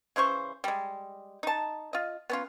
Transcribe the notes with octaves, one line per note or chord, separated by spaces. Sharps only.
C#3 E3 C5 C#6
G3 G#3
D#4 A5
F4 D#5
B3 C#4 F4